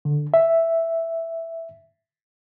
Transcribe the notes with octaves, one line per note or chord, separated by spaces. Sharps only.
D3
E5